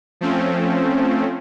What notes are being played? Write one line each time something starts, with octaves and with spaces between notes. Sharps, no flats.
F3 A3 C4 C#4